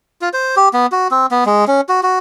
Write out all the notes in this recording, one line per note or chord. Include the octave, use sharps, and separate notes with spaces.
F4
C5
G4
B3
F#4
C4
B3
G#3
C#4
F#4
F#4